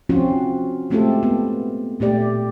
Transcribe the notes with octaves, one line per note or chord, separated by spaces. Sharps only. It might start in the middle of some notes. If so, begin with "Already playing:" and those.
F3 C4 C#4 F4 F#4
G#3 A3 C4 F4 G4 A4
B3
A#2 A3 G4 D5